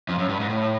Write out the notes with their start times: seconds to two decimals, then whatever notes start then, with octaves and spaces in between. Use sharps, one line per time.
0.09 F2
0.19 F#2
0.29 G2
0.40 G#2
0.50 A2